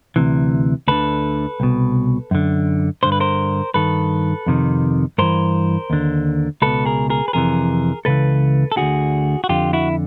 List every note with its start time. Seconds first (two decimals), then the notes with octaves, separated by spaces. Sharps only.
0.16 D2 C3 E3
0.88 D2 D3 A4 B4
1.60 C2 B2
2.31 F#2 D3
3.03 G2 D3 C5
3.12 B4
3.20 A#4 C5
3.74 G2 D#3 A4 B4
4.46 F2 C3 D#3
5.18 G2 E3 A#4 C5
5.90 D#2 D3
6.62 C#2 B2 A4 B4
6.85 G#4 A#4
7.10 G#4 A#4
7.28 B4
7.33 F2 C3 E3 G#4 A#4
8.05 C#2 C#3 E3 A4 B4
8.72 A4
8.77 D2 D3 F#4 G#4
9.44 F#4
9.49 F2 D3 F4 G4
9.73 E4 F#4